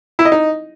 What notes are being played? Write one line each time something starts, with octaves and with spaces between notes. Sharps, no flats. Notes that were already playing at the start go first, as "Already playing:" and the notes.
E4
D#5
D#4